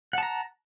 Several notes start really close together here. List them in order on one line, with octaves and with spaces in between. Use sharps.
F#5 A5 A#5